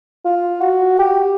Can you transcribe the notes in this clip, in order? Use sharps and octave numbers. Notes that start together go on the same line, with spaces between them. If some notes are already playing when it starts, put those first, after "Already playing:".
F4
F#4
G4